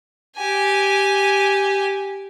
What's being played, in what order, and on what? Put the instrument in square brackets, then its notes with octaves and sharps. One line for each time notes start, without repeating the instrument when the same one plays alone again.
[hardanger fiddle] G4 G#5